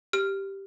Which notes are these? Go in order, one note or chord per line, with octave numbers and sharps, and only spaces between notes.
G4 F6